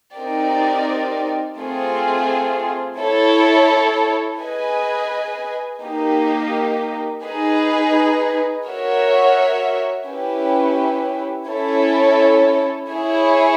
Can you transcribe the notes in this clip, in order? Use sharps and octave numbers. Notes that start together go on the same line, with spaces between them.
C4 D#4 G4 A#4 D5
A3 C4 F4 G#4
E4 A4 C#5
G#4 B4 D#5 G#5
A#3 D#4 G4
D#4 G#4 B4
F#4 A#4 C#5 E5
C#4 E4 G4 B4
C#4 E4 A4 C#5
E4 G#4 C#5